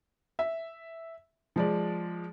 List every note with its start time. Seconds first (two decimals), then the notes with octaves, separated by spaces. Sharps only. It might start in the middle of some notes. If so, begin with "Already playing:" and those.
0.39 E5
1.56 F3 G#3 D5